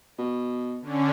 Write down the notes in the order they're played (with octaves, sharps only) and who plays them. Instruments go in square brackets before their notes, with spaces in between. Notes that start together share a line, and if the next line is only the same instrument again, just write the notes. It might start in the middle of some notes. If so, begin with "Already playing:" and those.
[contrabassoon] B2
[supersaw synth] D3 C#4